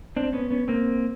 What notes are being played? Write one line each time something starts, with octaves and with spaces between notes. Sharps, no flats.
C4 D4
B3 C#4
B3 C#4
A#3 C4